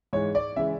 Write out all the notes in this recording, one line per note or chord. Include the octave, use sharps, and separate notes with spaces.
G#2 E3 G#3 C#5
D5
C#3 E3 G#3 E5